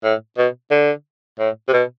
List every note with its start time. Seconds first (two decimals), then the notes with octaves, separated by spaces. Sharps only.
0.04 A2
0.37 B2
0.71 D3
1.39 A2
1.68 C3
1.73 B2